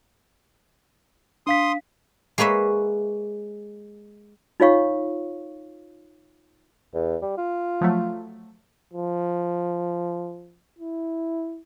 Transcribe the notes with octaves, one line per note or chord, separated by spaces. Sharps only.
D4 F5 C6 D#6 B6
G#3 A#3 B4 C#5 E5
D#4 F4 C#5 F5 C#6
E2
G3
F4
F3 F#3 A3
F3
E4